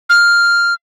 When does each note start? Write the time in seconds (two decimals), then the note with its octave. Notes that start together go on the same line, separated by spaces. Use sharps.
0.09 F6